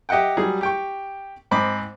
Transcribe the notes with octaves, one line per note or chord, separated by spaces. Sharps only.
G4 D#5 E5 F#5 G5
F#3 G3 G#4
G4 G5 C#6
G#2 C4 D#5 B5 D6